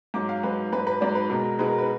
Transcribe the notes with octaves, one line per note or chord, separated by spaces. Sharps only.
G#2 F#3 D6
F5
G#2 F#3 B4
G#2 F#3 B4
B4
G#2 F#3 D5
B4
B2 G#3 A#4
A#4
B2 G#3 B4
A#4
B4